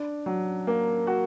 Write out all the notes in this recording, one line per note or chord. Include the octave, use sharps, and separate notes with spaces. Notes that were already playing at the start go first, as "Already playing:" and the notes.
Already playing: D4
F#3
A#3
F#4